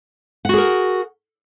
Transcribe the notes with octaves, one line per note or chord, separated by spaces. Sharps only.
F#4 G#4 A#4 F#5